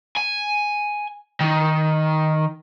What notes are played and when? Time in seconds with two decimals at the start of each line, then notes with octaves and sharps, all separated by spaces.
0.17 G#5
1.41 D#3